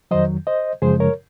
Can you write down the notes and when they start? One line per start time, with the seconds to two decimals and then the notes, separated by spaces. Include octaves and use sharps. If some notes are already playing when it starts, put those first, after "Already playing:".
0.11 F2 D#3 F#3 C5 D#5
0.47 C5 D#5
0.82 F#2 C#3 F3 G#3 G#4 C5
1.00 A#4 C#5